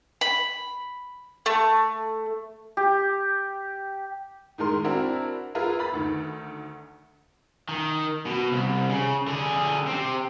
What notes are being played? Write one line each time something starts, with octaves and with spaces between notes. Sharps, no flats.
B5
A3
G4
A2 D#3 G#3 A#4 C6
C4 D4 E4 F#4 A#4
F4 G#4 A#4 B4 E5
B4 B5 A6
D2 D#3
D#3
B2
C2
C#3
D3 G#4
C3 C4